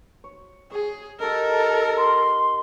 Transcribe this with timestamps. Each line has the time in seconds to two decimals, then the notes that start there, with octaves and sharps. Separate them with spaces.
0.24 C#5
0.71 G#4 C#5
1.20 D#4 G4 A4 A#4
1.97 C6